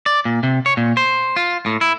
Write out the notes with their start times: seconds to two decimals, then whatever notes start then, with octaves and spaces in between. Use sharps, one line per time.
0.06 D5
0.25 A#2
0.43 C3
0.66 C#5
0.77 A#2
0.97 C5
1.36 F4
1.66 A2
1.81 E4